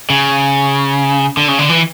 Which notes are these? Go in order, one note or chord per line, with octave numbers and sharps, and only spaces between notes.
C#3
D3
C#3
D3
E3